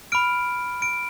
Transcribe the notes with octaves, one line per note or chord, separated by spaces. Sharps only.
B5 F6 D7
D7